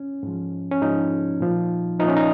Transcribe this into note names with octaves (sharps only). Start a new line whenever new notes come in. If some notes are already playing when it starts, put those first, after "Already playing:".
Already playing: C#4
G#2 F3
C#4
G#2 F3 D#4
A#2 F3
A#2 F3 C#4 D#4
D#4